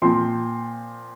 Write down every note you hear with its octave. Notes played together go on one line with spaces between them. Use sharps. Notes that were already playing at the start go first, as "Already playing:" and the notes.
A#2 F3 C4 C6